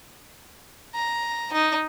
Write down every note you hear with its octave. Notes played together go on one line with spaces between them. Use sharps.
A#5
D#4